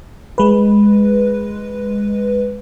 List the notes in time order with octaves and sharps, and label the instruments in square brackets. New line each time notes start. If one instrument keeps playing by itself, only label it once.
[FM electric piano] G#3 B4